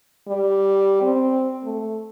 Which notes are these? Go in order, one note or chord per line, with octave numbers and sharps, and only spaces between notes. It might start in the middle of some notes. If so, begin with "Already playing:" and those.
G3
C4
A3